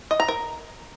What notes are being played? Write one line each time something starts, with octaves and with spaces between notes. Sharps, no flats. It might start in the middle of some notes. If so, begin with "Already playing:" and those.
D#5
A#5
A#4